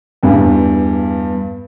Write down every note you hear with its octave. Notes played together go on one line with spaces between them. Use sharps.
E2 G2